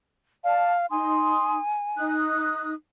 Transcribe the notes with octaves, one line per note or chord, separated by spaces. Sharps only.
D5 F5 A5
D#4 G#5 C6 D#6
D#4 D#6 F#6